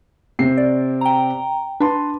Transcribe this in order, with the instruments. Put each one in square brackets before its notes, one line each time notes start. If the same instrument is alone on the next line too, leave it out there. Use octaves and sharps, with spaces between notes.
[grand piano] C3 C4 C7
[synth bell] D5
G5 A#5
[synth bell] D4 [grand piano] B4 A5 C6